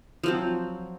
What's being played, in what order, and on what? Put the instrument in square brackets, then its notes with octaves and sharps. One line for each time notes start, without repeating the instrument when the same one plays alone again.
[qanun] F3 F#3 C4